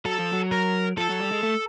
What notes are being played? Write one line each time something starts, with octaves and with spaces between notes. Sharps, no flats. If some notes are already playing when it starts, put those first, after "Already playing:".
F#3 A4
F3
F#3
A#4
F3 A4
F#3
G3
G#3
A3